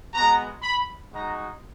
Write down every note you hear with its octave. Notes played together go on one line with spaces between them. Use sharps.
G#3 B3 F#4 A#5
B5
G#3 D#4 F#4 A#5